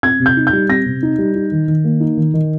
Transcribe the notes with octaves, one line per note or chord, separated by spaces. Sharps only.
C4 G#6
C3
G6
D#4
G6
G3
C4 A#6
C3
D#4
G3
D#4
D#3
D#3
A#3
D#4
D#3
D#3